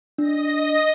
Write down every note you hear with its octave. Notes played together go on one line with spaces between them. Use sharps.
D4 D#5 A#6